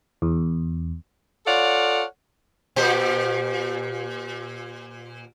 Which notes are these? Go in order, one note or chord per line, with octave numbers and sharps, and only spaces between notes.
E2
F4 A4 C#5 D5 F5 F#5
A#2 G4 C5